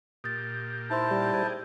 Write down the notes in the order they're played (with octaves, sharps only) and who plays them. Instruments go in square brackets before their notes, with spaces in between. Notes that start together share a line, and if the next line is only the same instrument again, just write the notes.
[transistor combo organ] A#2 G4 [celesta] D#6 A6
[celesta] D#4 C5 C6 [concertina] E4 A5
[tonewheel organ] G3
[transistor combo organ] G4 G#4 [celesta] C5